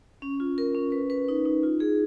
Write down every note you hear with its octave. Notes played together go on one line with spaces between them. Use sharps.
C#4
F4
A#4
C#4
B4
B4
D#4
D#4
F4
G#4